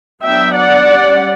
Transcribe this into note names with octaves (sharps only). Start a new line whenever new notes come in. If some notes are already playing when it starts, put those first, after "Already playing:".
F#3 B3 D4 E5 G5
D5 F#5
G3 C#4